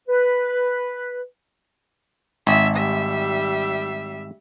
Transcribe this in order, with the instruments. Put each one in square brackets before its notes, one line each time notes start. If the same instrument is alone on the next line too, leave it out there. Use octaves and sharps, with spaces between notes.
[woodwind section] B4
[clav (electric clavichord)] G#1 [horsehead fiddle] E5
[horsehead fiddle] G3 E5